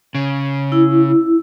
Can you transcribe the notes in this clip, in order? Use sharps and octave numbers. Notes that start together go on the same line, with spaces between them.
C#3
E4